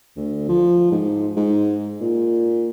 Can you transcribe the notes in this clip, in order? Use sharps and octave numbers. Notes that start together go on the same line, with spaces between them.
D2
F3
G#2
G#2
A#2